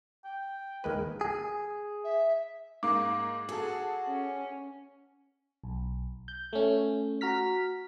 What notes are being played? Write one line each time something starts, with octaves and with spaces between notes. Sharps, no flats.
G5
D#2 G#3 A#4 B4
G#4
E5
G#2 A#3 D6
F#4 G#4 A4
C#4
B1
G6
A3 C#4
F#4 A#5 F6 B6